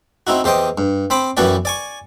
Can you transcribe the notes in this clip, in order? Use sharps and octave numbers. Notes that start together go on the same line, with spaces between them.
C4 D#4 E4 F#4
E2 G4 C5 D#5 G5 D#6
G2
C4 C5 B5 D6
F#2 E3 B3 F#4 G4 D5
D5 G#5 C#6